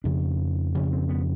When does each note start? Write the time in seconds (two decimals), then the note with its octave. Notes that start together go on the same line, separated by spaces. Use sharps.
0.04 F2 C#3 D4
0.74 F2 C#3 C#4
0.93 C4
1.09 B3